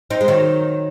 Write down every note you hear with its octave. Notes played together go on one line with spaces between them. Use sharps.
C4 D#4
G#3
D#3 F#3